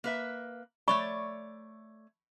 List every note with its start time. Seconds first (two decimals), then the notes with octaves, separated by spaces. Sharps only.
0.04 A#3 B4 E5
0.88 A3 C#5 D5 B5 C#6